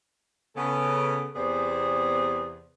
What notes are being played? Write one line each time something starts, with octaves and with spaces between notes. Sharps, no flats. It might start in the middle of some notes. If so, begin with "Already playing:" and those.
C#3 B3 A4
E2 C3 B3 G#4 C5 D5